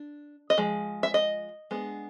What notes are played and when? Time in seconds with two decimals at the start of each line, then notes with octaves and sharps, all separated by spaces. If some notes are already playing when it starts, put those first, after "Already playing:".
Already playing: D4
0.50 D#5
0.57 F3 G#3
1.03 E5
1.14 D#5
1.71 G#3 B3 D4